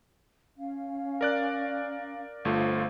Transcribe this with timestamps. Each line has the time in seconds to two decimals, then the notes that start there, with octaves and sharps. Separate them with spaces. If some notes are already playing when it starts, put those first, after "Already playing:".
0.57 C#4 F5
1.21 A#4 D5 F#6
2.45 G1 A3 F4 C5 F5